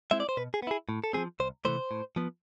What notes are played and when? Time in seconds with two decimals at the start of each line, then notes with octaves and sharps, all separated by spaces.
0.11 G#3 C4 E4 E5
0.20 D5
0.29 C5
0.37 B2 B4
0.54 G#4
0.62 B3
0.67 E4 G#4
0.89 A2
1.04 A4
1.13 F3 G#3 C4 G#4
1.40 C2 C5
1.65 C3 E3 A3 C5
1.91 A2
2.16 F3 B3